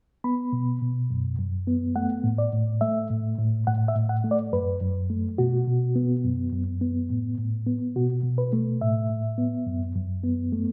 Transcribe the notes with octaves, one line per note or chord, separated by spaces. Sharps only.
B3 B5
B2
B2
F#2
F#2
B3
A3 F#5
A2
D5
A2
A3 E5
A2
A2
A2 F#5
E5
A2
F#5
A3
D5
F#2 B4
F#2
A3
B2 F#4
B2
B3
F#2
F#2
B3
A2
A2
B3
B2 F#4
B2
B4
A3
A2 E5
A2
B3
F#2
F#2
B3
A3